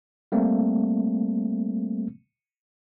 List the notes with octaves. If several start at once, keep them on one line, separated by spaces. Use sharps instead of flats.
G3 A3 A#3 C4